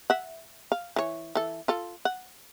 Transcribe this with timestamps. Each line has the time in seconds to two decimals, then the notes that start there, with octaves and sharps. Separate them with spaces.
0.10 E5 F#5
0.72 F5
0.96 E3 C#5
1.35 E3 A4
1.68 F4 A4
2.05 F#5